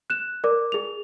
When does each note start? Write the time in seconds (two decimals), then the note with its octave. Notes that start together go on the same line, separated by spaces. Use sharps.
0.10 F#6 E7
0.44 A#4 D5 D6
0.72 G#4 F7